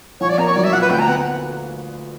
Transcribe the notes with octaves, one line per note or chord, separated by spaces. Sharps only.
A#1 C#5
D5
A#3 A#5
C#5
F#3 D5
E5
A#2 F#5
B4
D2 G5
A#5
B3 F#5